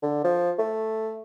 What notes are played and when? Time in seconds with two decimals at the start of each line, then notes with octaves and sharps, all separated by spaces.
0.03 D3
0.24 F3
0.59 A3